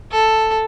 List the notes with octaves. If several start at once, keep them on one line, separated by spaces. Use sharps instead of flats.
A4